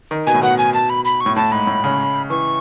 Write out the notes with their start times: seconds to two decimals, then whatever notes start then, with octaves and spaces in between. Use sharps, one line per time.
0.11 D#3
0.27 B2 G#5
0.34 A2
0.42 B2 F#5
0.58 G#5
0.74 A5
0.90 B5
1.05 B5
1.20 C#6
1.26 A2
1.36 A2 A5
1.52 G#2 B5
1.67 A2
1.84 C#3
2.30 E3 C#6